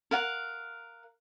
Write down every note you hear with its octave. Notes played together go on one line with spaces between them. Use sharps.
A#4 F5 F#5